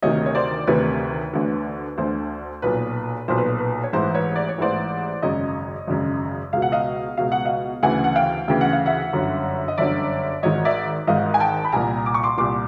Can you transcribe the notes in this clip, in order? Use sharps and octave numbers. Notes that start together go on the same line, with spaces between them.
D2 C3 D#3 C#5 D#5
C#5
C5 D5
D2 C3 D#3 B4 C#5
D2 D3
D2 D3 C5
B1 A#2 B4
B1 A#2 C5
B4
B4
C#5
A1 G#2 E3 C5
B4 C#5
D5
C#5
A1 G#2 E3 C5 D5
G#1 F#2 C#3 C#5 D#5
G#1 F#2 C#3
C#2 B2 F5
F#5
D#5 F5
C#2 B2 F5
F#5
D#5 F5
D2 C#3 E3 F#5 G#5
F#5
F5 G5
D2 C#3 E3 G5
F#5
F5
E5 F#5
G1 F#2 D3
D#5
G1 F#2 D3 D5 E5
G#1 G#2 D#3 C#5 D#5
D5 E5
G#1 G#2 D#3 D#5 F5
G#5
G5 A5
B5
C2 A#2 G#5 A#5
D6
C#6
C6 D6
C2 A#2 C6 D6